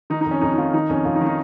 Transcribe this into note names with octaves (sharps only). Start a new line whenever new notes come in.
D#3 D#4
F2 D#4
C#4
F2 D#4
D#4
D#3 F4
D#3 D#4
F2 C#4
F2 F4
D#4
D#3
D#4